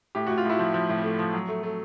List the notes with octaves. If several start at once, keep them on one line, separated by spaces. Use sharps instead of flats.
A2 G4
A2 F#4
F4
A2 E4 F#4
F3
F3
A2
A3
F3
F#3
A3
A3